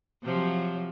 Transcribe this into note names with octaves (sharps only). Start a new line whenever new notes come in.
C3 F3 F#3